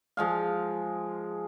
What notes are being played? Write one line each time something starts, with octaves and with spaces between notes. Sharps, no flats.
F3 G#3 F5